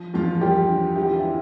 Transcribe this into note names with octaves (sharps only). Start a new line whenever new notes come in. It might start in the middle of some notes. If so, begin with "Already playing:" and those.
Already playing: F3
E2 F3 F4
F4
E2 G3 G4
D3
E3 G4
F4
E3 E4